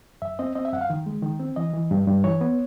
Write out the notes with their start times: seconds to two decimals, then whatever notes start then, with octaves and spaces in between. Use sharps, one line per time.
0.22 F#2 E5
0.39 C4 D#5
0.55 C4 D#5
0.65 E5
0.73 F#2 F#5
0.81 F5
0.90 D#3
1.06 G#3
1.23 D#3
1.40 C4
1.56 E3 D#5
1.73 E3
1.91 G2
2.07 G2
2.24 E3 C#5
2.41 B3